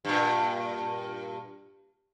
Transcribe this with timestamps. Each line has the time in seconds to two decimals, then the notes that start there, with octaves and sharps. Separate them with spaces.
0.05 G2 A#2